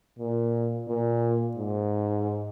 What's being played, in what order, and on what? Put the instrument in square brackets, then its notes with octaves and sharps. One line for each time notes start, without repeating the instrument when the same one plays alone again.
[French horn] A#2
A#2
G#2